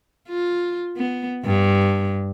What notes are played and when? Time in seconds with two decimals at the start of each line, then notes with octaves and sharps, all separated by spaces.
0.29 F4
0.96 B3
1.45 G2